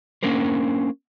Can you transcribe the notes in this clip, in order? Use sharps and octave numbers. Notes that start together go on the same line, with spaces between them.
A#3 C#4 D4 A#4 C5